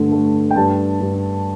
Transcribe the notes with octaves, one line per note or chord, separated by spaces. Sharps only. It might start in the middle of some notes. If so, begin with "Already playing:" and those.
Already playing: G2 D3 A3
A3
G5
G2 A5
G2